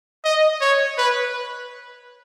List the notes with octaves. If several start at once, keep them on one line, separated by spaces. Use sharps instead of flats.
D#5
C#5
B4